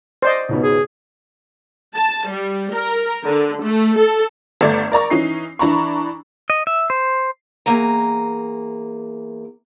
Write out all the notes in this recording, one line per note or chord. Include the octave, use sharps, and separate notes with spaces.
C5 D5 D#5
C#2 G#2 B2
G#4
A5
G3
A#4
D3
A3
A4
G1 A3 D5 G#6
A#4 D5 A#5 C#6
E3 C#4 D#4 C7
E3 D4 A#5 B5 C#6
D#5
E5
C5
E2 A#3 G#5 A#5